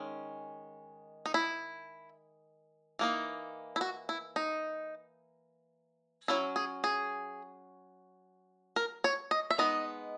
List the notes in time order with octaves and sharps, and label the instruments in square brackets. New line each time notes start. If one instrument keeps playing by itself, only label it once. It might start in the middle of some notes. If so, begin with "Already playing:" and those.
Already playing: [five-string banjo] D#3 G#3 C#4
D#4
E4
E3 A#3 D#4
E4
F#4
E4
D#4
F#3 C#4 E4
G#4
G#4
A#4
C#5
D#5
E5
G#3 B3 D#4 D#5